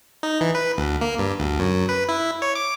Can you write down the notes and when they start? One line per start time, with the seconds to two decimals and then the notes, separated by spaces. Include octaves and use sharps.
0.23 D#4
0.41 E3
0.55 B4
0.78 D2
1.01 A#3
1.19 G2
1.40 D2
1.59 F#2
1.89 B4
2.09 E4
2.42 C#5
2.55 D6